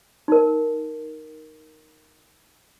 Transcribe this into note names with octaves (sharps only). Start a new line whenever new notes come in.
D#4 A#4